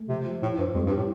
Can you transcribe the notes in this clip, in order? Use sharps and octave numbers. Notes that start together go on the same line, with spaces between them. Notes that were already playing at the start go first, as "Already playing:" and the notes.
Already playing: A3
C3 F3
F3
A2 F4
G2 C5
F2 G3
G2
G4
A2